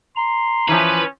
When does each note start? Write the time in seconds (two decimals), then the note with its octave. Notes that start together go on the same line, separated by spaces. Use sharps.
0.16 A#5 C6
0.69 E3 F3 C#4 B4 B5